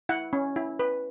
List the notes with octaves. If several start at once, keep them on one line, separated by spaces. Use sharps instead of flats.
E4 F#5
C#4
E4
B4